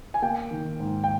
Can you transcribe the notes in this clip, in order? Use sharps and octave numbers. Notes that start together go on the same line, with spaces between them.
G#5
A#3 G5
D#3
G#2
G5